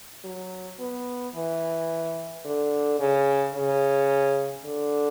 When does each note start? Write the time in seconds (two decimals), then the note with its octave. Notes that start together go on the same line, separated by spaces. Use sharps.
0.24 F#3
0.79 B3
1.35 E3
2.45 D3
2.99 C#3
3.54 C#3
4.64 D3